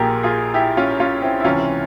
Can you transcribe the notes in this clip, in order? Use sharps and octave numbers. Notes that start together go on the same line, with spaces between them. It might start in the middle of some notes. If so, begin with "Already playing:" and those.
Already playing: A#1 A#2 F4 G4 G#4 A#4
F4 G#4
E4 G4
C#4 F4
C#4 F4
C4 E4
E4
C#2 C3 E3 C#4 F4